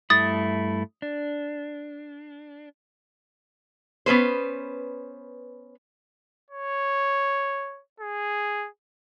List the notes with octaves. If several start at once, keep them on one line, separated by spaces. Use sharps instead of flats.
G2 A3 E4 D#6 A6
D4
B3 C#4 B4 C5
C#5
G#4